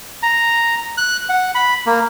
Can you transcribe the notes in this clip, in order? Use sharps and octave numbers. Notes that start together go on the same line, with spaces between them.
A#5
F#6
F#5
B5
A#3